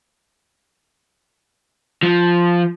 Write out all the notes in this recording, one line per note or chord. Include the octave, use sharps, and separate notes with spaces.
F3